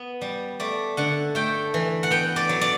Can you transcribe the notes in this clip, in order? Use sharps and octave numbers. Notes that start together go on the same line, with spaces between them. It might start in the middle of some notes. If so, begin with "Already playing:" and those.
Already playing: B3
G3
A3 D5
D3 F#5
A3 G5
E3
F#5
B3 G5
D5
F#3
D5